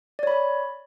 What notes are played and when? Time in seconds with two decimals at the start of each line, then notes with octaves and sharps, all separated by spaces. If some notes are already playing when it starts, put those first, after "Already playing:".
0.19 D5
0.23 C#5
0.27 B5